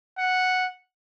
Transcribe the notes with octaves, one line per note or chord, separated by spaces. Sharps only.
F#5